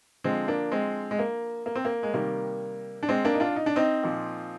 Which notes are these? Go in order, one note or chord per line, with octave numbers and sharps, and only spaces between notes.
D3 F3 G#3 C4
A#3 D4
G#3 C4
G#3
A#3
A#3
C4
A#3
G#3
C3 D#3 G3 A#3
D4
G#3 C4
A#3 D4
D#4
D4 F4
D#4
D4
C4 D#4
A#2 F3